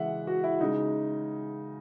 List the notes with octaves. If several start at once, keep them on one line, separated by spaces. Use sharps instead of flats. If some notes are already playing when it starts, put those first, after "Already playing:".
Already playing: C#3 E3 G#3 E5 F#5
F#4
E4
C#3 G#3 D#4